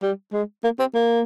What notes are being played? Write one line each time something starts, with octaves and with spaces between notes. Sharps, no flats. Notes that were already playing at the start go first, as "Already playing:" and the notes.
G3
G#3
A#3
C4
A#3